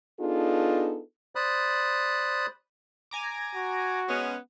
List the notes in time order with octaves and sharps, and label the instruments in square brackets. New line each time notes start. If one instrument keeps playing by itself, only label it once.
[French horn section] B3 D4 D#4 F4 G#4 A4
[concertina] C5 D5 B5 D#6 F#6
[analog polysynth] G#5 A#5 D6
[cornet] F#4
[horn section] G#3 B3 C#4